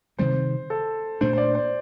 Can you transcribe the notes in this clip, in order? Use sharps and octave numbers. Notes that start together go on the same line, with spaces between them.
C3 D#3 G3 C4 C5
A4
A#2 A3 D4 C5
C5
D5
C5